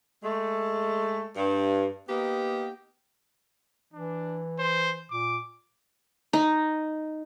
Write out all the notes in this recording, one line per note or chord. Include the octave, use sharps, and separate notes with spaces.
G#3 A3
G2
A#3 B3 D#4 G4
E3 D4
C5
A#2 D6
D#4